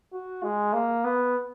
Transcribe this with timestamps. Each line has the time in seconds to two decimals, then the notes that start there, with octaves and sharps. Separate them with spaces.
0.13 F#4
0.43 G#3
0.73 A#3
1.04 B3